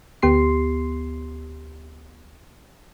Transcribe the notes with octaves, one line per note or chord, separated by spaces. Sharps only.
D2 B3 G4 C6 C7